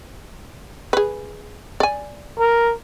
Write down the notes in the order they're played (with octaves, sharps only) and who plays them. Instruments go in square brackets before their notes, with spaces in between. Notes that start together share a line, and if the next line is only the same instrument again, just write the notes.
[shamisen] G#4 B4
D5 G#5
[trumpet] A#4